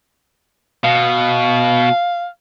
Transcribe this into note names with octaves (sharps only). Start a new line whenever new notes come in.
B2 F5